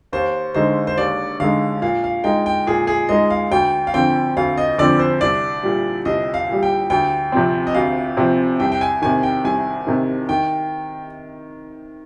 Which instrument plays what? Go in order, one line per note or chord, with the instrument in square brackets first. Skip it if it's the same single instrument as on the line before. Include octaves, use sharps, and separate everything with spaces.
[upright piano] D#2 [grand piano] C5
[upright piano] D3 G#3 D#4 [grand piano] C5
[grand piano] C5
[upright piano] D#2 [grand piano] D5
[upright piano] D3 G#3 D#4 [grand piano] F5
[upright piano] A#2 [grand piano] F5
[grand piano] F5
[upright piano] G#3 D#4 [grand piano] G5
[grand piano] G5
[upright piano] A#2 [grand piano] G#4
[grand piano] G#4
[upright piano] G#3 D#4 [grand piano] D#5
[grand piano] F5
[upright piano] D2 [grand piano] G5
[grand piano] F5
[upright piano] D3 F3 C4 [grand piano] G5
[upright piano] D2 [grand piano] F5
[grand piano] D#5
[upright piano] D3 F3 C4 [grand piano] D5
[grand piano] C5
[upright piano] C2 [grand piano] D5
[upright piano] A#2 G3
[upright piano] C2 [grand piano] D#5
[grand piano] F5
[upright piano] A#2 G3
[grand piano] G5
[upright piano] D2 [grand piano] G5
[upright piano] C3 F3 C4
[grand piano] D#5
[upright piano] D2 [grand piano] F5
[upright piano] C3 F3 C4
[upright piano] C2 [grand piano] G5
[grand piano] G5
G#5
[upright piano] C3 D#3 [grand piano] G#5
[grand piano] G5
[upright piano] C2 [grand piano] G#5
[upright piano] C3 D#3
[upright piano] D#3 [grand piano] G5